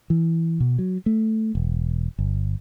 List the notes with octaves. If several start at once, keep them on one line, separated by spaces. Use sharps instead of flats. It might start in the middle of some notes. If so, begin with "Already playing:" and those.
E3
B2
F#3
A3
E1
G1